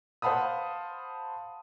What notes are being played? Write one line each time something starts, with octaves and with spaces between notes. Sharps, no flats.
C5 F5 F#5 A5 B5 D#6